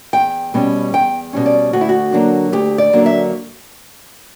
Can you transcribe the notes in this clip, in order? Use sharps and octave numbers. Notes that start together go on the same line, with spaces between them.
E2 G5
B2 G3 C#4
E2 G5
B2 G3 C#4
D5
D2 F#4
E4
F#4
D3 F#3 A#3 D4
D2 G4
D5
D3 F#3 A#3 D4
E5